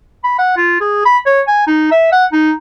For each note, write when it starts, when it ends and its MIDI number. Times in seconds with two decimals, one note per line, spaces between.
0.24 0.38 83
0.39 0.55 78
0.57 0.78 65
0.81 1.03 68
1.05 1.18 83
1.27 1.42 73
1.48 1.67 80
1.67 1.88 63
1.92 2.08 76
2.12 2.26 78
2.32 2.51 63